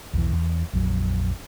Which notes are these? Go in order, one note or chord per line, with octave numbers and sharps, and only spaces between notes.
B1 E2 B2 E3
E2
A#1 F2 F#3